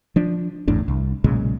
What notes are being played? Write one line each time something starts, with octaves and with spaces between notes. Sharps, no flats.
F3 D4
G1 E2 A2 D4
C2
B1 A#2 C#3 G#3